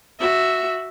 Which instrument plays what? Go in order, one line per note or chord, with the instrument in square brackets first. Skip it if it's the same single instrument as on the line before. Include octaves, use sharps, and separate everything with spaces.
[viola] F#4 E5